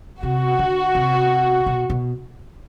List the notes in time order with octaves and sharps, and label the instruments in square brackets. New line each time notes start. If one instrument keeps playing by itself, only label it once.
[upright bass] C3 [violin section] F#4
[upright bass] D3
C3
B2
B2